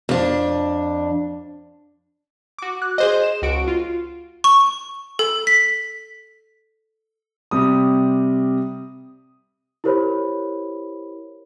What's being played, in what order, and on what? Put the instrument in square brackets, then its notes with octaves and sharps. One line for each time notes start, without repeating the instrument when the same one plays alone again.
[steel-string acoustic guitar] F2 D4
[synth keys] F#4 D6
F#6
G#4 C5 D#5
E7
C#2 F#4 D7
F4
[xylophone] C#6
A4
B6
[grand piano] C3 G3 D#6
[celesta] E4 G4 A#4 C5 C#5 B5